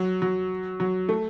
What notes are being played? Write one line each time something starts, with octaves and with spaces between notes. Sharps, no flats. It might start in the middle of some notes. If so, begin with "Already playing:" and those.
Already playing: F#3
F#3
F#3
A3